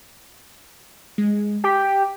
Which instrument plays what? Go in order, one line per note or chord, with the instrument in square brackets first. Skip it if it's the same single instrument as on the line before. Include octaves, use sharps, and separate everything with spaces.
[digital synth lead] G#3
[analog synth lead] G4 [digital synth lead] B6